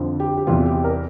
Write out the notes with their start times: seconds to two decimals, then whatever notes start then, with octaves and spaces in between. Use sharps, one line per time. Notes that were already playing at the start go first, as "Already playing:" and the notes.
Already playing: F2 D3 F3
0.20 G4
0.37 G4
0.47 E2 C3 E3 F4
0.66 G4
0.84 A#4